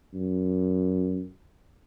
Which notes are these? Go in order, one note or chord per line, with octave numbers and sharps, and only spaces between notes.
F#2